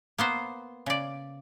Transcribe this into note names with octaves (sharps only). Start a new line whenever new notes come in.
A#3 B3 C5
C#3 D5